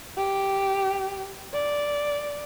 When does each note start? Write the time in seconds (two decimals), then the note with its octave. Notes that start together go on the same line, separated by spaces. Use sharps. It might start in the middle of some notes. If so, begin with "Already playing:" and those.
0.17 G4
1.53 D5